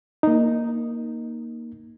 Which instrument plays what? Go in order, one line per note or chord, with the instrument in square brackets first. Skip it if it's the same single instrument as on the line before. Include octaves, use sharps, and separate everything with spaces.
[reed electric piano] A#3 D#4